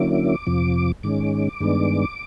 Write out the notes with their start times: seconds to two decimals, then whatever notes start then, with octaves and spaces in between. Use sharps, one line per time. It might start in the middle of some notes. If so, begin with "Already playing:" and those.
Already playing: D3 F#3 A#3 C#4 E4 D6
0.47 F2 C3 F3
1.03 G#2 D#3 G#3 C#4 D6
1.60 G2 D#3 G#3 B3 D4